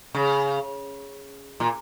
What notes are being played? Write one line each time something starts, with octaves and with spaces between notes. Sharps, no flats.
C#3
A#2